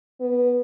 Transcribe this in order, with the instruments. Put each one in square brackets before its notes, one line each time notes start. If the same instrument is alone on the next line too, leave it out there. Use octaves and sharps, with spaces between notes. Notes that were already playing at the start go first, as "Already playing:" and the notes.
[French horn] B3